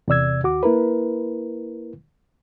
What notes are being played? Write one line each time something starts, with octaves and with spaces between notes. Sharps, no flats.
E2 C3 D5 E6 G#6
D#2 F#4 D6
A#3 E4 A#4 B4